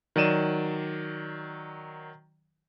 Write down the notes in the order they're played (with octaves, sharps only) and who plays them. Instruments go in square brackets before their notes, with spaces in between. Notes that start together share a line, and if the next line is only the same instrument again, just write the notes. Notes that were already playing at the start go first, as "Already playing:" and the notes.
[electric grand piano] D#3 F#3 D5 D#7 E7